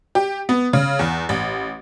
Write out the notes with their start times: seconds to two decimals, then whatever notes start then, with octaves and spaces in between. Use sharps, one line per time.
0.15 G4
0.49 B3
0.73 C#3
0.99 E2
1.29 A1